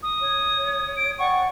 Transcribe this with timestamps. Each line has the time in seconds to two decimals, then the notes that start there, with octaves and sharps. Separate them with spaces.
0.03 D#6
0.21 C#5
0.97 D7
1.19 D5 F#5 G5 C#6